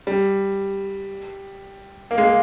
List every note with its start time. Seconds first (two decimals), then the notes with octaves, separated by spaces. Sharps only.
0.07 G3
2.11 A#3
2.18 G#3
2.25 A#3